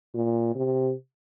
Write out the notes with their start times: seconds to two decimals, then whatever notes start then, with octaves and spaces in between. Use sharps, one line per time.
0.14 A#2
0.55 C3